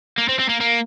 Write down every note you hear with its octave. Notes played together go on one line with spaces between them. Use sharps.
A#3
C4
C4
A#3
A#3